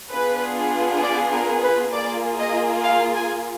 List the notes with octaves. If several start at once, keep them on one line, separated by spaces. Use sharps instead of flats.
B3 D4 F4 G#4 B4
D5
A#4
B4
A#3 F4 G#4 D5
D#5
F5
G#5